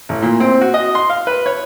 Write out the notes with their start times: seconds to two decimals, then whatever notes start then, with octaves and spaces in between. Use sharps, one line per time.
0.09 A1
0.22 A#2
0.40 C4
0.61 F#4
0.74 D#5
0.95 C6
1.10 F5
1.27 B4
1.46 C#5